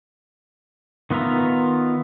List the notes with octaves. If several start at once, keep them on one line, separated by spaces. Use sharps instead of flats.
D#3 B3 F4 E5 A#5